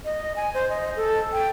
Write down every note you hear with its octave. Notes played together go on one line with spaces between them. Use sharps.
D#5
G#5
C5
D#5
A4
G5